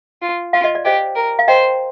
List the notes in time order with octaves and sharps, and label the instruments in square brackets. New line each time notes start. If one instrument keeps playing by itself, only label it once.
[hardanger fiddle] F4
[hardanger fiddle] F4 [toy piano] F5
[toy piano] D#5
D5
[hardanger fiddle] G4 [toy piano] C5 D#5
[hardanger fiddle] A#4
[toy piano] F5
[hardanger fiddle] C5 [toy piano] D#5 G5